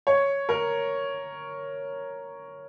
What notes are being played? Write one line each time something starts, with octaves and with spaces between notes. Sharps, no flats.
C#5
A#4